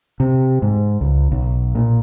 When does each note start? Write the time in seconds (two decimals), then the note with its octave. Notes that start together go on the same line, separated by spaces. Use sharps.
0.20 C3
0.62 G#2
1.01 C#2
1.32 B1
1.75 A#2